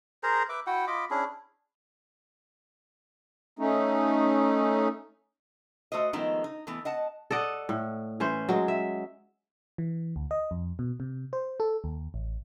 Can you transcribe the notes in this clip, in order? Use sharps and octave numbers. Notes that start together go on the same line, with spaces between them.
G#4 A#4 C5 A#5
B4 E5 D6
E4 F#4 F#5 G5
F4 D#5 B5 D6
C#4 D4 E4 G#4
A3 C#4 D#4
A3 F#4 C5 D#5
D#3 F3 G#3 A3 B3 D#4
D#4
E3 A3 B3
D#5 F#5 A5
A4 D5 D#5 F#5
A2
E3 C#4 C5
F#3 G#3
E5
E3
D2
D#5
F2
B2
C3
C5
A4
D#2
A1